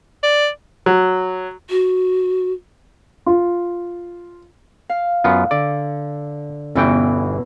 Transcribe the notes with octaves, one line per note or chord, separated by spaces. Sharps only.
D5
F#3
F#4
F4
F5
F#2 B3 F4
D3 D5
G1 E2 B2 E3 C#4 G5